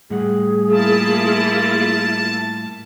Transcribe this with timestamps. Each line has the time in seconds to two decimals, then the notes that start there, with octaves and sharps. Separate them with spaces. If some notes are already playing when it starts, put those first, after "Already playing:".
0.10 A2 G3 G#4 F#5
0.71 A#3 E4 F4 A5